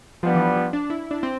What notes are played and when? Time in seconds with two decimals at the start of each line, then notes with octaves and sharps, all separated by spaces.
0.23 F3 G3 B3 D4
0.35 E3
0.40 F3
0.56 F3
0.73 D4
0.90 E4
1.11 D4
1.23 C4